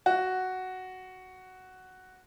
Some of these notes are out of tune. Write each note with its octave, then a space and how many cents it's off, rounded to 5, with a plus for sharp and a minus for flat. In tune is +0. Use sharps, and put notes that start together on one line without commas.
F#4 +5